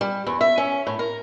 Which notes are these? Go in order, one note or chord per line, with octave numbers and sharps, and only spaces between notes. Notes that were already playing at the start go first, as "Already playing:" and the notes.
G3
E2
E5
C#4
A2
A#4